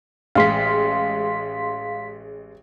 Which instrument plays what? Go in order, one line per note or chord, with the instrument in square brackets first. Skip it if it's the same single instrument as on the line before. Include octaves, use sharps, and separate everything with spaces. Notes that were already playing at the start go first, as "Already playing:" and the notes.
[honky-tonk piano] A1 G#3 [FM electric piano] F5 C6 B6